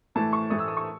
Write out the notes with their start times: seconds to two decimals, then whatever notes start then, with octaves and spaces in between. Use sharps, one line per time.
0.15 A2 E3 A3 A5
0.33 C#6
0.50 A2 E3 A3 D#6
0.59 E6
0.68 D#6
0.77 C#6